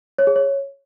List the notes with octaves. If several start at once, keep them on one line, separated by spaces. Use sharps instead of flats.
C#5
G#4
C#5